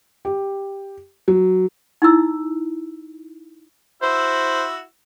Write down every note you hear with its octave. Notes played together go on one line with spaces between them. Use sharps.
G4
F#3
D#4 E4 E6
E4 F#4 C5 E6